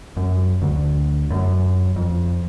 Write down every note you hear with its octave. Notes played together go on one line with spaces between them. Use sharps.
F#2
D2
F#2
F2